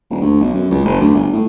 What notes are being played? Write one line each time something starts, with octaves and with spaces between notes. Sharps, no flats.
D#1
D2
B1
F#2
C#2
F#1
D2
G1
A2